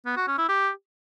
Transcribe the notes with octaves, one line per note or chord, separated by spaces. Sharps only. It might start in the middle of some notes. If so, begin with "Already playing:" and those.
B3
F#4
C#4
E4
G4